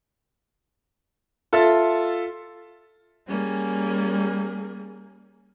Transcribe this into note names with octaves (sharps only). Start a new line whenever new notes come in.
F4 A4 E5
G3 A#3 C#4 G#4